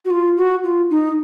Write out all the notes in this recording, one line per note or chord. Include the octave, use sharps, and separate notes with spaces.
F#4
F4
F#4
F4
D#4